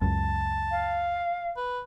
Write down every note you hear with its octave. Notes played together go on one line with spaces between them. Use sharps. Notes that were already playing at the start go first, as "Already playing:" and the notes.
C#2 F#2 A5
F5
B4